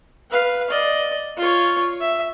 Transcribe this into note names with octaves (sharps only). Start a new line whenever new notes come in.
B4 F5
D5 D#5
F4 C#5
E5